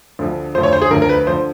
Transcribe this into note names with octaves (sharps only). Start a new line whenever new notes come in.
D2 D3 F3
D2 D3 F3 C5
C#5
C5
G#4
D2 D3 F3 A#4
A#4
B4
D3 F3 C5